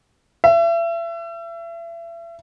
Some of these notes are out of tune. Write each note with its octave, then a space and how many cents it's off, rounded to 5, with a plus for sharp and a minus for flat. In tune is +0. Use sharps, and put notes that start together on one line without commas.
E5 +35